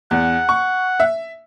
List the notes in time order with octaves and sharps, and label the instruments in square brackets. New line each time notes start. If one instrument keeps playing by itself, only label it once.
[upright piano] E2 [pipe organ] F#5
[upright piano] C#6
E5